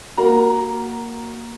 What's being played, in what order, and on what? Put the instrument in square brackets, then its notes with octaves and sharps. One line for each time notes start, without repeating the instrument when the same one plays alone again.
[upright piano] A#3 F#4 A#4 A#5